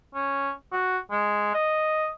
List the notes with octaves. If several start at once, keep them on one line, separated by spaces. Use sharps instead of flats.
C#4
F#4
G#3
D#5